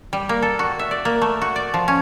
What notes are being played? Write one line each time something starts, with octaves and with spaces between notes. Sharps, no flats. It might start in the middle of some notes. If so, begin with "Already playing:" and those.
G3
A#3
A4
F#4
E5
D5
A#3
A3
F#4
D5
F3
C#4